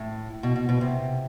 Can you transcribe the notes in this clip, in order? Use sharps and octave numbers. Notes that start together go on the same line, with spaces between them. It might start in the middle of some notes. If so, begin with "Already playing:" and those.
Already playing: A2
B2
B2
B2
C3